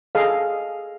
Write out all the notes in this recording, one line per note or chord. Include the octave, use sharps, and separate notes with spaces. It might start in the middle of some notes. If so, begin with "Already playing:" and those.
G#4 A4 D#5 F5